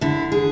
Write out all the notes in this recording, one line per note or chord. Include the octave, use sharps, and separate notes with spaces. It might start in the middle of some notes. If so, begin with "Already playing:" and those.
D3 E4
G#4